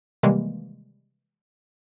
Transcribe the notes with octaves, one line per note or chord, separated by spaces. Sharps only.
C3 D#3 E3 G3 G#3 A#3